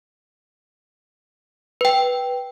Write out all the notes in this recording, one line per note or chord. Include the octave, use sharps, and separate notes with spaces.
B4 G5